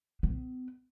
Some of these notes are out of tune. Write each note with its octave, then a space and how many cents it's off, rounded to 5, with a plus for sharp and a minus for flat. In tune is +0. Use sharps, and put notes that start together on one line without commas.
B3 +45